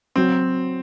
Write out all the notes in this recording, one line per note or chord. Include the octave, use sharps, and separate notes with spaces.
F#3 C4